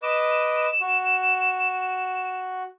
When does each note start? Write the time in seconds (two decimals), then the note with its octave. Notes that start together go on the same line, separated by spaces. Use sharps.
0.03 B4 D#5 D6 E7
0.81 F#4